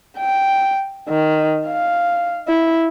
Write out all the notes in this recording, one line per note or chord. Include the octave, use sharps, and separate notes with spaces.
G5
D#3
F5
E4